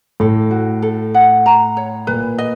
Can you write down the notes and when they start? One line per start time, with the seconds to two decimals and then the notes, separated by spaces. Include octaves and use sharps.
0.20 A2 A4
0.51 F#4
0.82 A4
1.15 F#5
1.46 A#5
1.77 C#5
2.07 A#2 B4
2.38 D#5